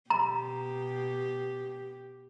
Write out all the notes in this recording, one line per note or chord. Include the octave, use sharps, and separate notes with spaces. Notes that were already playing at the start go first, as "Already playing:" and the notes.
B2 G4 A#5